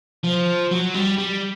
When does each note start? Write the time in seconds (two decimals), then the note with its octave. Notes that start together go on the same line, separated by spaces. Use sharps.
0.24 F3
0.71 F#3
0.94 G3
1.18 G3